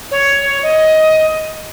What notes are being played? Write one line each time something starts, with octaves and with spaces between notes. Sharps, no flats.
C#5
D#5